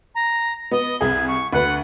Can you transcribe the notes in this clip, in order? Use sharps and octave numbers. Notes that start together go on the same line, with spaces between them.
A#5
B3 D#5
C2 G#4 G#6
C#6
D2 B4 F#5